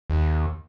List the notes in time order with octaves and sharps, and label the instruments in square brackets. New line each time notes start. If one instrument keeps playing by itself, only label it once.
[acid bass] D#2